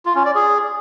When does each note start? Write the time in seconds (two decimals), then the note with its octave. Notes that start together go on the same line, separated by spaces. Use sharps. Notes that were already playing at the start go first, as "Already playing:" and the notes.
0.06 F4
0.15 C#4
0.25 D5
0.35 G#4